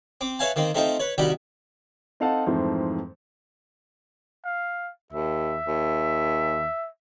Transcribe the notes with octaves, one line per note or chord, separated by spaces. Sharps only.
C4 D6
B4 C#5 E5 F5 G#5 A5
D#3 A#3 C4
A3 C4 D#4 F4 C5
B4 C#5
C2 D#3 G3 F#4 G5 B5
C4 D#4 A4 F5 F#5 A5
F2 G#2 E3 F3 A3 C4
F5
D#2 E5
D#2